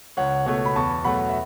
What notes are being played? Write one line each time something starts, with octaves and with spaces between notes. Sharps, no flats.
C#2 C#5 F#5
B2 A3 C#5 F#5
B5
E2 A5 C#6
B2 F#3 A3 F#5 B5
E5